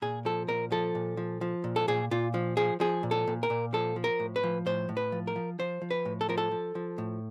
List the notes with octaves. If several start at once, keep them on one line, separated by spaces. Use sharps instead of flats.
A#2 G#4
F3 A4
A#2 A#4
F3 A4
A#2
F3
F3
A#2
A4
A#2 G#4
A#2 F4
F3
F3 G#4
F3 G#4
A#2
A4
A#2
A#4
A#2
F3 A4
F3
A#4
A2
B4
F3
A2 C5
A2
B4
F3
A#4
F3
F3 C5
F3
B4
A2
A4
F3 A#4
A4
F3
F3
A2